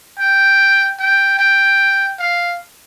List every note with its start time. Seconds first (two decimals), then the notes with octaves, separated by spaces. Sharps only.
0.19 G5
1.00 G5
1.39 G5
2.19 F5